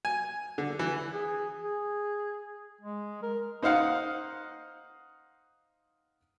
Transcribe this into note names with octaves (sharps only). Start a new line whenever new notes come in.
G#5
D3
E3
G#4
G#4
G#3
A#4
D#4 C5 D#5 F5 F#5